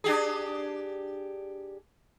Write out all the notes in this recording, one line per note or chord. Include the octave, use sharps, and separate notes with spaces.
D4 G4 G#4